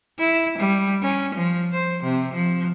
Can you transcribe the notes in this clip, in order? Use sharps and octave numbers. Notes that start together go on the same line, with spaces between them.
E4
G3
C#4
F3
C5
C3
F3